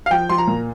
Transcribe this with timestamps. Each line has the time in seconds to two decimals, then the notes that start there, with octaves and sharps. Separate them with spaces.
0.06 F5
0.11 F3 G5
0.29 F3 C6
0.38 A#5
0.47 A#2